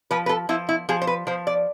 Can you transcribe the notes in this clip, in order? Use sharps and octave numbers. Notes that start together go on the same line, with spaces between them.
F3 B4
B4
A4
F3 E4
E4
F3 G#4
C5
B4
F3 C5
D5